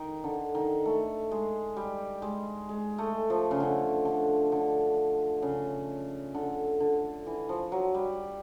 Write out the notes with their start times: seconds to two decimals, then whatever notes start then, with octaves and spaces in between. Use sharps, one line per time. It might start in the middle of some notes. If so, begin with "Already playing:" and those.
Already playing: D#3
0.24 D3
0.55 D#3
0.86 A3
1.32 G#3
1.76 G3
2.22 G#3
2.69 G#3
2.98 A3
3.30 F3
3.51 C#3
3.60 D3
4.05 D3
4.52 D3
5.42 C#3
6.34 D3
6.80 D3
7.27 E3
7.49 F3
7.72 F#3
7.94 G3